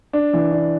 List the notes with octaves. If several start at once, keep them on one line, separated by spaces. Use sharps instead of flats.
D4
E3
D4